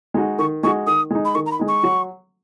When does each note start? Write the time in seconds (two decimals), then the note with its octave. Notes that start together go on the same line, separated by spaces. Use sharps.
0.14 G#3 D#4 F#4
0.38 D#3 C#6
0.63 G#3 D#4 F#4 C#6
0.86 D#3 D#6
1.10 G#3 D#4
1.25 B5
1.35 D#3 C#6
1.46 A#5
1.51 B5
1.59 G#3 D#4
1.68 C#6
1.83 F#3